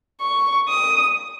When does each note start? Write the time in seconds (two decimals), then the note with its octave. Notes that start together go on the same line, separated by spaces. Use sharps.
0.21 C#6
0.68 D#6